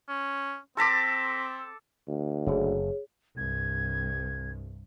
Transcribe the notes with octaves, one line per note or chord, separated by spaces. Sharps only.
C#4
C4 A4 A5 C6 D6 A#6 B6
D2
F#1 G#4 C#5
C2 G2 G#6